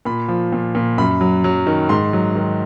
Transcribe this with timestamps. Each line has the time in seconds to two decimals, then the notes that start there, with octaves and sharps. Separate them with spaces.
0.05 A#2 B5
0.28 F3
0.52 A#2
0.75 A#2
0.98 F#2 B5
1.21 F#3
1.44 F#3
1.67 D#3
1.89 G#2 C6
2.13 F#3
2.36 D#3